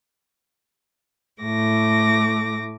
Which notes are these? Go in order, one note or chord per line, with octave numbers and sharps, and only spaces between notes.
A2 A3 D6 A#6